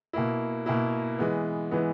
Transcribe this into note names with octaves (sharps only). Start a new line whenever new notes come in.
B2 A#3 E4
B2 A#3 E4
E3 G#3 B3
E3 G#3 B3